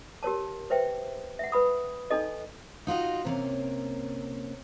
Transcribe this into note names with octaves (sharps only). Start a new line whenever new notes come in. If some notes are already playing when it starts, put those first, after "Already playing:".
G4 A#4 C#5 A5
B4 C5 E5 G5
E5 F#5
B4 B5 D#6
D4 D#4 A4 D#5
D#4 F4 F#4 D#5
C3 A#3 C#4